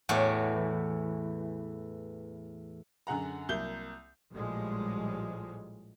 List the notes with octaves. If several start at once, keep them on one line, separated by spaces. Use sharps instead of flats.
E2 A2 E3 F#4 D5
F#2 D3 G#4 F#5 A#5
C2 F#3 A#3 G6 G7
A#1 A2 F3 G3 G#3